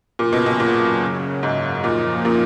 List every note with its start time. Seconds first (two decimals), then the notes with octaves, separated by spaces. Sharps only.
0.19 F#2 A#2 C#3 F#3
0.32 B2
0.46 B2
0.60 A#2
1.43 G#2
1.84 F#2 A#2 F3 A#3 D#4
2.25 A#2